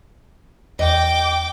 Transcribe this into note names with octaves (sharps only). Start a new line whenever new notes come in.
E2 D#5 G5 D6